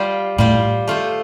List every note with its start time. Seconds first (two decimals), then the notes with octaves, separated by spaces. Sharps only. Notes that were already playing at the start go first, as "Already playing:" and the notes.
Already playing: G3 F4 C5 F5
0.38 A2 G3 F4 C5 F5
0.87 A3 F4 C5